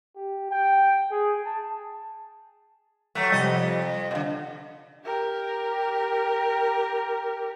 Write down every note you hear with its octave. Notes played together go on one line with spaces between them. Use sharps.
G4
G5
G#4
A5
F#3 A3 F#6
F2 C3 F3 G3 D#5
B2 D3 D#5 F5
G4 A#4